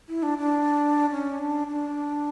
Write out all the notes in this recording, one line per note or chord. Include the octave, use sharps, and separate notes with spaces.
E4
D4
D4
C#4
D4
D4